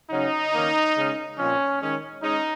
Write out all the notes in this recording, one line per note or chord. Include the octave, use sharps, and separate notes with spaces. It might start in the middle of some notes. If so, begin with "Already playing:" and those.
C#3 F#3 C#4 D#4
D#3 A#3 C#4
C#3 G#3 C#4
A#2 F3 C4 C#4
D#3 G#3 C#4
G#3 C#4 D#4